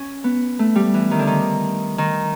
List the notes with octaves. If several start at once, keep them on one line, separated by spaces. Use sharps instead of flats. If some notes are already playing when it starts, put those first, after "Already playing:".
Already playing: C#4
B3
A3
G3
E3
D#3
D3
D#3
D#3